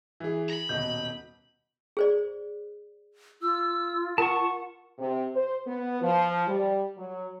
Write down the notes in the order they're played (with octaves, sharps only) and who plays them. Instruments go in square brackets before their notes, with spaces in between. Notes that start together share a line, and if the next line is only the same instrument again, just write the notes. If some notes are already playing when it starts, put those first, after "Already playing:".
[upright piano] E3 G#4
[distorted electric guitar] A#5 B5
[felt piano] D#1 B2 D#5 [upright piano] G6
[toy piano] G#4 C5 D5
[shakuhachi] F4 [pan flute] E6
[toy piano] A#4 [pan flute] F#5 [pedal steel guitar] A5 C#6
[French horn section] C3
C5
B3
F3
G3
F#3